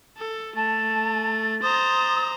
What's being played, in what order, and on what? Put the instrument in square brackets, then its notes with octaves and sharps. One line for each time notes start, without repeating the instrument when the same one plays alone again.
[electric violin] A4
[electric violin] A3 [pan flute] A5 [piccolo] A6
[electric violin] C5 A#5 [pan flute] D#6